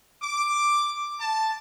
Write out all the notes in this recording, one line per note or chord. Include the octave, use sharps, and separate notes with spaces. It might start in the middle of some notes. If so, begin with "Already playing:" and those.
D6
A5